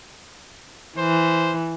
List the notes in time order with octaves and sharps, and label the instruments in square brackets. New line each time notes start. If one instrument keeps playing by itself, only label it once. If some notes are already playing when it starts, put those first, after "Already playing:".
[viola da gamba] E3 [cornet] C5